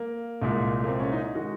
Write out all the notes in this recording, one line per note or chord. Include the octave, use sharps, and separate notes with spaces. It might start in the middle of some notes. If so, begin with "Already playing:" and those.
Already playing: A#3
C2 A#2 G#3
A#3
C4
C#4
D#4
D#4
D#3 G#3 F#4